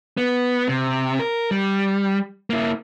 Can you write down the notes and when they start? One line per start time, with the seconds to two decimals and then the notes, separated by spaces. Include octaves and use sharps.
0.17 B3
0.69 C3
1.19 A#4
1.51 G3
2.50 A#3 E4